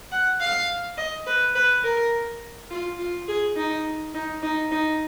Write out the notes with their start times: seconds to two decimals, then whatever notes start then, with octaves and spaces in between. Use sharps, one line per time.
0.11 F#5
0.40 F5
0.97 D#5
1.26 B4
1.55 B4
1.84 A#4
2.70 F4
2.99 F4
3.28 G#4
3.56 D#4
4.14 D#4
4.42 D#4
4.71 D#4